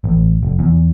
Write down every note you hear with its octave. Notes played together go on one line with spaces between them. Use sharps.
A1
F1
E2